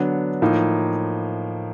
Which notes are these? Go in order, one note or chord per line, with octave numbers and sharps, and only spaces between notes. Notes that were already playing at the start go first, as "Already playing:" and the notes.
Already playing: D3 F#3 B3 D4
A2 F3 A#3 D#4